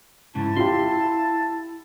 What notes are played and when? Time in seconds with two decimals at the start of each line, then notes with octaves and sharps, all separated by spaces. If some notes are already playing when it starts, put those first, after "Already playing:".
0.35 G#2 C#3 E4 A5
0.56 F4 G4 C6